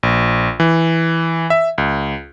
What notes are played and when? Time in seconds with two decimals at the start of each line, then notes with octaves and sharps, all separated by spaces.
0.03 A#1
0.60 E3
1.50 E5
1.78 C#2